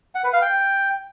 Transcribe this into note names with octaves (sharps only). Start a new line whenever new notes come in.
F#5
B4
F5
G5